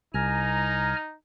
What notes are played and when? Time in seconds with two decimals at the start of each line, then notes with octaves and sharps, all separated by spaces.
0.14 C2 D#4 G#5 A#5 F6